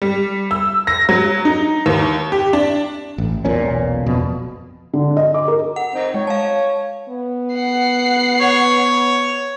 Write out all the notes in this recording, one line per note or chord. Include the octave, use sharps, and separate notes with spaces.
G3
E6
A#6
F#3
D#4
D#2
G4
D4
A1
E1 B1 A#2 C#4
F2 B2
D3
D#5
D6
A#4
F#5
C4 D#4
G#3 C#5
F5 A5
B3
F#5 C7
C#5